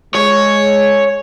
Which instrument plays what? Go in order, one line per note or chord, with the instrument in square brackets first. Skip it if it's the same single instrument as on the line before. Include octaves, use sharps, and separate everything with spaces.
[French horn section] G#3 [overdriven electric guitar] C#5